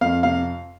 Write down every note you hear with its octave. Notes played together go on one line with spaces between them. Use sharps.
F2 F5
C3 F5